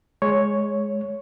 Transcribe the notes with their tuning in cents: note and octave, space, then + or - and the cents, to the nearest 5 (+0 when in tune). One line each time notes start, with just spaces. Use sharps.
G#3 +5 C#5 +0